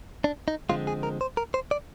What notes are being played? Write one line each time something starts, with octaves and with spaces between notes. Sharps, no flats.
D4
D#4
D3 F3 G#3 C4 F4
G#4
A#4
C5
A#4
C5
D5